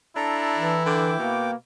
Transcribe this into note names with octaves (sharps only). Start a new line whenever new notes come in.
D4 E4 A4 A#5
E3
D3 G5 D6
B2 A#3